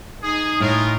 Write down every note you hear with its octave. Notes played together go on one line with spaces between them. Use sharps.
D#4 G#4 D#6
A2 G#3 F4 A#4